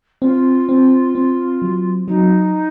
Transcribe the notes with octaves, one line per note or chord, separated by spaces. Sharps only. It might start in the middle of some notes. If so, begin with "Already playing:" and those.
C4 F4
C4
C4
F#3
F#3 D#4